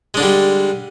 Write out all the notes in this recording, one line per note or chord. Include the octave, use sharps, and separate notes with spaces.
D3 G3 G#3 D4